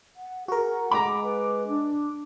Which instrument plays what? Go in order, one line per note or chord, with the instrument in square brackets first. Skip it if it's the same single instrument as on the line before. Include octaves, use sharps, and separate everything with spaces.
[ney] F#5
[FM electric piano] F#4 A#4 [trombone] G#4 [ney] F#5
[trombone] G#3 [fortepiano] A#5 B5 [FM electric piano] D6
[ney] B4
D4